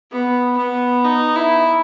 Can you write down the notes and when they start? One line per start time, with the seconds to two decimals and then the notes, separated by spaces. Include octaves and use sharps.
0.11 B3
0.57 B3
1.04 D#4
1.36 E4